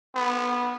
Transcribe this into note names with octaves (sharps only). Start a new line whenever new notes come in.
B3